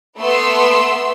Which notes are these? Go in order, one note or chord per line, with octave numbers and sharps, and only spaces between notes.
A3 B3 C6 E6